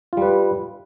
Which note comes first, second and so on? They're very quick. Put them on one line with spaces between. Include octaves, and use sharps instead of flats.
F4 G3 B4